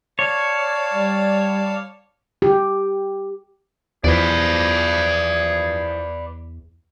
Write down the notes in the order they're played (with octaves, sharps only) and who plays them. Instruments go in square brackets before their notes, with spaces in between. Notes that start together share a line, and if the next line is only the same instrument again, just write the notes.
[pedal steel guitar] C#5 [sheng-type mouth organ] D5 F5 A5
[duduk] G3
[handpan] G4
[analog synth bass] E2 [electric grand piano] E3 F3 B3 [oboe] G#4 [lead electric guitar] B4 D5